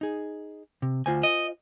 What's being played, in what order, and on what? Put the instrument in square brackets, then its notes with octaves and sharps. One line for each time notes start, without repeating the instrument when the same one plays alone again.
[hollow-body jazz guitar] D#4 G#4
C3
[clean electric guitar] D2 [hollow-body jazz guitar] F4 C5 G#5
[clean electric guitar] D#5